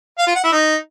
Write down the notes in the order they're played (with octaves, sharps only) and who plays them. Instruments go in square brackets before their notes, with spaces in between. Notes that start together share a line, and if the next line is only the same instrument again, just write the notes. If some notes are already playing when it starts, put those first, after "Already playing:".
[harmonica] F5
F4
F#5
E4
D#4